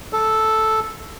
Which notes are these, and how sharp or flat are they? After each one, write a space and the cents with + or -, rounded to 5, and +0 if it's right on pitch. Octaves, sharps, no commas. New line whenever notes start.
A4 -5